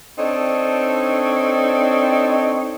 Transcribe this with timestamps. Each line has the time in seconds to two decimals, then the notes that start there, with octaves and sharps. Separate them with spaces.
0.18 C4 D4 D#4 A4 C#5